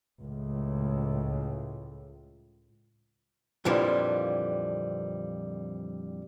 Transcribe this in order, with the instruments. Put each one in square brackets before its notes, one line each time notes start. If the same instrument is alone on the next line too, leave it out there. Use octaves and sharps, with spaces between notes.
[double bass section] C#2 A2
[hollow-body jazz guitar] F2 A#2 D3 E3 F3 G3